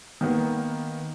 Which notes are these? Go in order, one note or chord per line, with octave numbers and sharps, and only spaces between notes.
D#3 A#3 B3